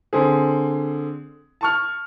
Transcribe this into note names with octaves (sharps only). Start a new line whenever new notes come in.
D3 C4 G#4
A5 C#6 F6